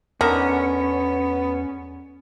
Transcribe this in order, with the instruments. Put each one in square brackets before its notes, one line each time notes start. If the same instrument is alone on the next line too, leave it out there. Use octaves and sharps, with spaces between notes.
[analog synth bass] E2 [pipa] D3 D#4 A#4 [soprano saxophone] B3 [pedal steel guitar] C#4